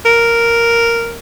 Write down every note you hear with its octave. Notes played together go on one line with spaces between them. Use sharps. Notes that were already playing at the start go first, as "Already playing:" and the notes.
A#4